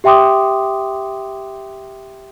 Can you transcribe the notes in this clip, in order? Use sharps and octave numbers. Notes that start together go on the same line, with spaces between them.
G4 E5 G5 C6 D6 D#6